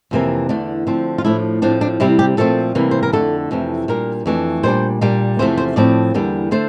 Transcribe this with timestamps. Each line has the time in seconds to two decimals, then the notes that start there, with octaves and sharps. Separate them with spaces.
0.11 F2 C3 E3 A#3
0.49 E2 D3 A3 D4
0.87 D3 F3 A3 C4
1.18 F4
1.25 A2 F3 A3 D4 E4
1.62 A2 F3 C4 D4
1.81 D4
2.00 C3 G3 C4 E4
2.19 G4
2.37 A#2 F3 A3 C4 A4
2.75 C3 E3 G3 A#3
2.91 C5
3.03 A#4
3.13 F2 D3 A3 D4 A4
3.51 F2 C3 E3 A3
3.88 A#2 G3 A#3 D4 A#4
4.26 F2 E3 A3 D4
4.63 A#2 G3 D4 C5
5.01 A#2 G3 A#3 D4
5.39 E2 C3 F3 A3 C5
5.58 C5
5.76 A2 F3 C4 D5
6.14 E2 D3 G3 A#3 D4
6.51 D3 A3 D4 C5